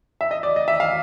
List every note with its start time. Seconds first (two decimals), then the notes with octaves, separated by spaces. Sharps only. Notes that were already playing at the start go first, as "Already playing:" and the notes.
0.21 E5
0.31 D#5
0.43 D5
0.56 D#5
0.68 E5
0.80 F5